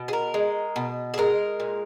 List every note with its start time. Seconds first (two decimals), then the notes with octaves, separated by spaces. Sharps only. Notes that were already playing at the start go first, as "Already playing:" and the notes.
Already playing: B2
0.08 G#4
0.13 A#4
0.34 G#3
0.76 B2
1.14 G#4
1.18 G#3 A#4
1.60 A#2